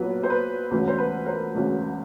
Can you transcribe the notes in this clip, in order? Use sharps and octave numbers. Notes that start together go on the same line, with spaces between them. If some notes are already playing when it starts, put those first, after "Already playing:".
Already playing: B1 A#2 F#3 B4
C5
B4
E1 D2 C#3 B4
C5
B4
A#4 C5
E1 D2 C#3